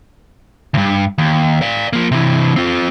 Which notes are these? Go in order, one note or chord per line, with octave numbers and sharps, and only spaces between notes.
D2 G2
D#2
D5 F5
F3 A#3
C3 E3
C4 F4